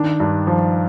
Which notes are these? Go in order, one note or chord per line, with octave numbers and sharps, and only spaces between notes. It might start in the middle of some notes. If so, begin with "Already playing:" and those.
Already playing: D#3 D4
G2
F3